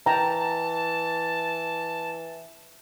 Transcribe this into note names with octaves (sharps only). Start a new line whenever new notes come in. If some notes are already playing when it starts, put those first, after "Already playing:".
E3 G5 A5 A#5